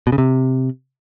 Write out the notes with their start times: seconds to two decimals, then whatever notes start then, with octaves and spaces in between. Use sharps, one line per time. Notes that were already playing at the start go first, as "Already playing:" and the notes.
0.07 B2
0.12 C#3
0.18 C3